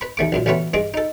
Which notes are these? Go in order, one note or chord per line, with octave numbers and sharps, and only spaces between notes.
B4 B5
D#2 A3 D6
A#1 F#2 A#2
A1 D2 A3 B3 C#4 B4
G2 G#3 G#4 D6
D#4 A4